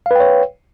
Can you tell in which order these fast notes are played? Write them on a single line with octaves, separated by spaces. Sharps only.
F5 B4 G5 C#5